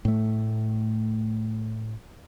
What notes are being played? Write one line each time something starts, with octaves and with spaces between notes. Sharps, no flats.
A2 A3